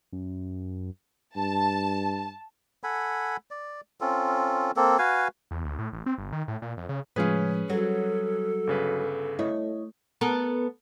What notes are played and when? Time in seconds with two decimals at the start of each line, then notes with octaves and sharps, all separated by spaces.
0.13 F#2
1.36 G2 A5
2.84 A4 F#5 G#5 B5
3.51 D5
4.01 C4 C#4 F4 A4
4.76 A#3 C4 A4
4.99 F#4 B4 F5 G#5
5.51 E2
5.65 D2
5.79 A2
5.93 A1
6.06 C4
6.18 G1
6.33 D#3
6.48 A2
6.62 A#2
6.77 F2
6.89 C#3
7.16 A2 C#3 F3 G#3 C#4 F4 G#4 B4
7.70 F#3 G3 A4
8.67 G1 C#3 B4
9.39 A3 E4 C#5 D#5
10.21 B3 A4 A#4